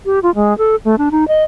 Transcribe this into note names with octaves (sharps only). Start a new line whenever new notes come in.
G4
F4
G#3
A4
A3
D4
D#4
D#5